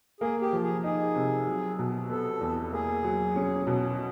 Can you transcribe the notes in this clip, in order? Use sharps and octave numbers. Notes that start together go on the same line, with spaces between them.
A#3 G#4
G4
F3
G#4
D#4 G#4
C3
F#3
B2
B3 A4
E2
A#3 G#4
F#3
C#4
B2